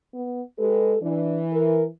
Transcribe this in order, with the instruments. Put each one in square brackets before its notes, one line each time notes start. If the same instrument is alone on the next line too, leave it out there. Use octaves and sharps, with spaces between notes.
[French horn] B3
[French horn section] G#3 G4 B4 [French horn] A4
[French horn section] E3 [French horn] D4
[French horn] A#4